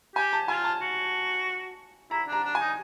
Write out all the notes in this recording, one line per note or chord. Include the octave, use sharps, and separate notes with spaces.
G4 G#5
A5
F4 G#5
A5
F#4
E4 A#5
D4
A#5
D4
G#5
D#4